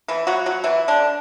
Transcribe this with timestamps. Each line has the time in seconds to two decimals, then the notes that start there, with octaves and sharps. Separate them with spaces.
0.08 E3 E4
0.27 F#3 F#4
0.46 F#3 F#4
0.64 E3 E4
0.88 D3 D4